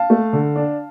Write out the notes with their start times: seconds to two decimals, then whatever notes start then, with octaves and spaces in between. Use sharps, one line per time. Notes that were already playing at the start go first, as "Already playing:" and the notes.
Already playing: F5 A5
0.10 A3
0.33 D3
0.56 D4